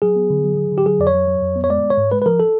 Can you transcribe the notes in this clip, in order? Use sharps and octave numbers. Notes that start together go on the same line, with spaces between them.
F#3 G#4
B3
D3
F#3
F#3
D3
G4
F#3 G#4
F2 D5
C#5
F#3
F#3
F2
B3
C#5
G#3 D5
G#3
C#5
G#2
G#3 B4
B4
F3 A#4
A4